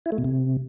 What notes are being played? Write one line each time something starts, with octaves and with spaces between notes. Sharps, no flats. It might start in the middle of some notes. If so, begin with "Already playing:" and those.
E4
A3
B2
C3